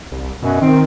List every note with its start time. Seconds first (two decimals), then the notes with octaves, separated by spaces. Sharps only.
0.12 C2
0.42 F#2 B2
0.61 D#3 C4